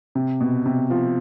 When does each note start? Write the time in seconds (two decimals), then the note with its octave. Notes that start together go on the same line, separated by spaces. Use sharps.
0.15 C3
0.41 B2
0.66 C3
0.90 F3